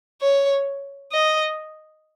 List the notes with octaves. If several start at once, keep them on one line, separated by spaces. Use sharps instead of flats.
C#5
D#5